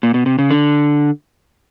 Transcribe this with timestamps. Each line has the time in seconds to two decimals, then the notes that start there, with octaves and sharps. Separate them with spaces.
0.03 A#2
0.14 B2
0.26 C3
0.39 C#3
0.51 D3